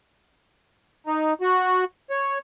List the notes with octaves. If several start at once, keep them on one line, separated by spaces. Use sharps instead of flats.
D#4
F#4
C#5